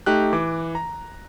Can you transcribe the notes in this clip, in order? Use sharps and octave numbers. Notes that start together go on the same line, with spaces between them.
A3 D#4 G4 F#6
E3 D6
A#5